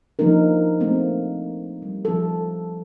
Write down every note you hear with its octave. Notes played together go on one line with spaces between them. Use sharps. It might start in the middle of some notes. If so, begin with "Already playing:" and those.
F3 A#3 D4 D#4 A#4
A3 A#3 C4
G3
F3 A4